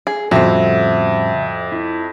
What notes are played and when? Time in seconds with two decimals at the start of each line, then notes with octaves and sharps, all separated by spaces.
0.07 G#4
0.31 F2 A2 C#3 G3 C4 F#4 E5
1.72 E4